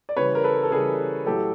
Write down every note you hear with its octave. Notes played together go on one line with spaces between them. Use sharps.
D5
C#3 E3 G3 B4 C#5
A#4
A4 B4
A4
C#3 E3 G3 G#4 A#4
A2 F#3 G4 A4